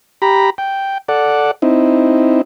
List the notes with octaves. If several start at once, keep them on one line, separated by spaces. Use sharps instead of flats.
G4 A#5 B5
G5
A4 D5 F#5
C4 D#4 E4